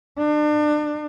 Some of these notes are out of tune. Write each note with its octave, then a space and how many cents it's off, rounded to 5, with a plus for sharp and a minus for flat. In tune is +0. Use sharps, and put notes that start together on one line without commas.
D4 +35